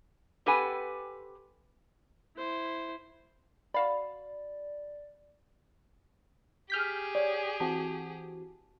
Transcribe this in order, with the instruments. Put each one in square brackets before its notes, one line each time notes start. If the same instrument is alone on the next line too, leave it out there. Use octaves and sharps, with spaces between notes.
[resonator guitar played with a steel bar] C4 G4 A4 B4 F#5 G#5
[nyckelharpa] E4 C5
[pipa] F#4 F5 B5 [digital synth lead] D5
[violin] G4 G#4 [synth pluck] F6 G6 B6
[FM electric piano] C#5 [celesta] D5
[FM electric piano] E3 C4 F#4 [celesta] A5